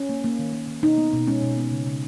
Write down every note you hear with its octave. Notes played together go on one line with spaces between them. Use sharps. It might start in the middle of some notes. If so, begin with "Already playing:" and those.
Already playing: C#4
A#3
A#3
D#3
A#3
D#3
B2 D#4
B3
B2
G#3 C#4
B2
B3
C#3
C#3